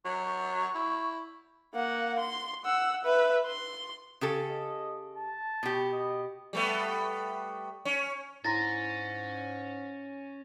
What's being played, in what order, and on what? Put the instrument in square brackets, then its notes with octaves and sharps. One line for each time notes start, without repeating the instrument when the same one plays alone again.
[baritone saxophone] F#3 [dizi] C#6
[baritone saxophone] E4
[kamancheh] A#3 F#5
C6
F#5 E6
B4 E5
C6
[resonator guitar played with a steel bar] C#3 G4 A4
[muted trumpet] D#5
A5
[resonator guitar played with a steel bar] B2 G4
[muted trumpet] D#5
[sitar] G3 A3 B3
C#4
[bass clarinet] G#2 [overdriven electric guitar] C#4 [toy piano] E4 A#5 C6 [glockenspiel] A6 A#6